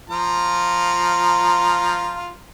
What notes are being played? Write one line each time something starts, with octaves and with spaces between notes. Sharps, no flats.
F3 F4 A#5